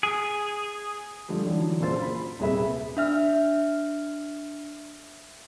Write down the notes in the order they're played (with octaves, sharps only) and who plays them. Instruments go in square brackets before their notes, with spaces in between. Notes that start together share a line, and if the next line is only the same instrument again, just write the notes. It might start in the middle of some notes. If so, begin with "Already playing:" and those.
[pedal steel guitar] G#4
[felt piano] D3 F3 G3 A3
D3 E3 F#3 D4
A#1 C#3 F4 C5 C6 A6
B5
D#1 C3 G#4 B4 E5 B5
[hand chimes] D4 E5 F6